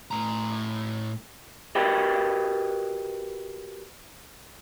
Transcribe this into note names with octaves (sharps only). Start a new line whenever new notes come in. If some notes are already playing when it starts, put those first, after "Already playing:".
A2 A#5
F#4 G4 A#4 B4 D#5 G5